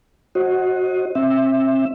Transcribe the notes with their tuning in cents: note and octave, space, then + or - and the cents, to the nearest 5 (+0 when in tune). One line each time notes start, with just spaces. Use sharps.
F#4 +0 C5 +35 D#5 +15
C4 +35 E5 +0